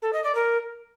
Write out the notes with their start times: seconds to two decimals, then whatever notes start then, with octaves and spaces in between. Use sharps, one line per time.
0.02 A4
0.13 D#5
0.24 D5
0.35 A#4